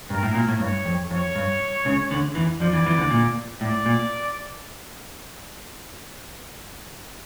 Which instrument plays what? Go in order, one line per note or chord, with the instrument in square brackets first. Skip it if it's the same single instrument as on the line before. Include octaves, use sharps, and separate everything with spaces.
[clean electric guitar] G2 [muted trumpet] A#4
[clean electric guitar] A2
A#2
A2
[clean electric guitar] G2 [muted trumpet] C#5
[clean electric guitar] F2
[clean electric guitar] F2 [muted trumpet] C#5
[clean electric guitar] G2
C#2 C#3
D2 D3
E2 E3
[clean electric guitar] F2 F3 [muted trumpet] D5
[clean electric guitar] E2 E3
E2 E3
D2 D3
A#2
[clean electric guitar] A2 [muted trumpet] D5
[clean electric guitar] A#2